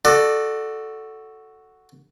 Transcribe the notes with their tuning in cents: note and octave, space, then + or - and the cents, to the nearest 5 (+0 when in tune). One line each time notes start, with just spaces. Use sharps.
F#4 +0 A4 +0 D5 +25